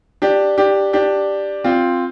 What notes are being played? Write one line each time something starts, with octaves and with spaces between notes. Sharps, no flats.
D4 G4
D4 G4
D4 G4
C4 F4